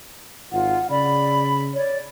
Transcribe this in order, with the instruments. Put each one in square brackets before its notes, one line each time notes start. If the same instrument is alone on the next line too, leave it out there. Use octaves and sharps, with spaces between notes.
[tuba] G#1 [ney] F4 [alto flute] F#5
[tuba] C#3 [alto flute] D5 [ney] B5
[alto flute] C#5 [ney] D5